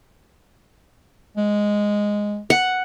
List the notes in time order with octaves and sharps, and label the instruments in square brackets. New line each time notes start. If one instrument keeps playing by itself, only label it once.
[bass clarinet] G#3
[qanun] F#5